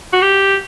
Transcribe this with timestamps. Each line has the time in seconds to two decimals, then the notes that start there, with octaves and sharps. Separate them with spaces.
0.13 F#4
0.22 G4